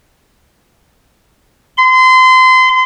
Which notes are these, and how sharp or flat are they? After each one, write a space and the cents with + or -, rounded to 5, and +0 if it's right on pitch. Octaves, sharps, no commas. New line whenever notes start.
C6 -30